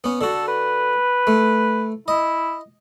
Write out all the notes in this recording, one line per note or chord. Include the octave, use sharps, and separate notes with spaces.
B3 C#4
D3 F#4 A4
B4
A3
E4 D#5